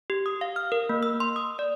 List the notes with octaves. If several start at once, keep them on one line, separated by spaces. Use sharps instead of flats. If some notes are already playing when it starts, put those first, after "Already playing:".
G4
D#6
F5
F6
A#4
A#3
E6
C6
D#6
D5